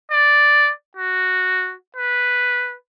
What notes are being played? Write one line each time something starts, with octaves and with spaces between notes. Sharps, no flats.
D5
F#4
B4